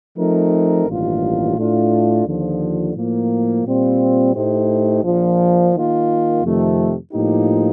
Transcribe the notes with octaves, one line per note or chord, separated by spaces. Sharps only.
F3 A3 C4 D#4 A#4
A1 G2 D#3 A#3 F4
A2 A3 D4 F4
D#2 D3 F3
A2 F3 A#3
A#2 G3 C4 F4
A2 A3 D#4 G4 C5
A#1 A#2 F3
D#3 A#3 F4
F2 C3 D#3 A3
A2 F3 A#3 D#4 G4